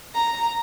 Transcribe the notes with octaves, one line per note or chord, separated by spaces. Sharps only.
A#5